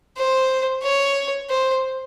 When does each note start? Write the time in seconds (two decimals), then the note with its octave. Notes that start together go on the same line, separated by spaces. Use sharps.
0.17 C5
0.83 C#5
1.50 C5